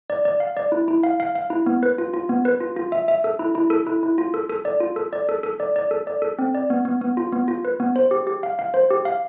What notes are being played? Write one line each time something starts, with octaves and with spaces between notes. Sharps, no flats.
D5
D5
F5
D5
E4
E4
F5
F5
F5
E4
B3
B4
F4
F4
B3
B4
F4
F4
E5
E5
A4
E4
E4
A4
E4
E4
F4
A4
A4
D5
F4
A4
D5
A4
A4
D5
D5
A4
D5
A4
C4
D5
B3
B3
B3
F4
B3
F4
B4
B3
C5
G4
G4
F5
F5
C5
G4
F5